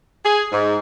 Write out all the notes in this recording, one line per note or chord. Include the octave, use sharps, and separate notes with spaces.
G#4
G#2